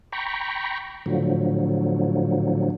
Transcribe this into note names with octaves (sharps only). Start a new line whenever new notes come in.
G5 A#5 B5 C#6
A2 D3 F3 F#3